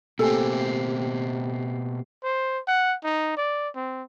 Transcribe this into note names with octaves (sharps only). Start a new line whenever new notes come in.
B2 A3 A#3 C4 G4 A4 G#5
C5
F#5
D#4
D5
C4